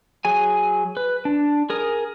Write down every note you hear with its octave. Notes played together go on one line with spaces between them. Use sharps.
F#3 G#4 G#5
B4
D4
G#4 A#4 D#6